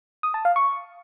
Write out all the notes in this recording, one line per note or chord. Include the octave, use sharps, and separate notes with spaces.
D#6
A5
F5
C#6